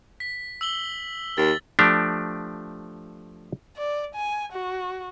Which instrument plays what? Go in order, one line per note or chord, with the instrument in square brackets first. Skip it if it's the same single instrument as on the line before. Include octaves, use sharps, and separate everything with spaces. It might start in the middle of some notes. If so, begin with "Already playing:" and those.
[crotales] B6
E6 F#7 G7
[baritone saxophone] D#2 [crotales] A6
[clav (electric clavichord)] F3 A3 D4 G4
[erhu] D5
G#5
F#4